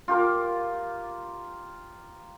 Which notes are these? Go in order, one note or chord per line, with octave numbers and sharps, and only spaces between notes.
F4 G4 A#4 D6